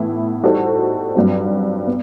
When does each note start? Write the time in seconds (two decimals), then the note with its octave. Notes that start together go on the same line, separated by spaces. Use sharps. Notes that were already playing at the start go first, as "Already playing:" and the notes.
Already playing: A2 E3 B3 E4
0.43 G3 D#4 F#4 A4 C5
1.15 G2 F#3 C4
1.87 B3